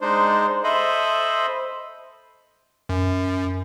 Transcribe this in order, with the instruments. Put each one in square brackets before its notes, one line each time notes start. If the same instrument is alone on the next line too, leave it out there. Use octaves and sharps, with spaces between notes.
[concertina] G#3 D4 D#4 C5
A4 C5 D#5 E5 B5
[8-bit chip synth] F#2